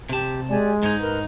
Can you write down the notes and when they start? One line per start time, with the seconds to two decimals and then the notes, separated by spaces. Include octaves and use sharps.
0.09 C3 G4 A5
0.49 G#3 G4 D5 G#5
0.83 G#2 D#4 G#6
1.00 A#4 B4